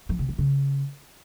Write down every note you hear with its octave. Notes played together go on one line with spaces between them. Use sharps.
F3
C3
E3
C#3